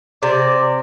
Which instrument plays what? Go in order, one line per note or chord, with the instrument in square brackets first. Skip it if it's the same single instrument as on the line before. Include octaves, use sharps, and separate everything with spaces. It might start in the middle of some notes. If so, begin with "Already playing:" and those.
[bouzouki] C3 [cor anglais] D5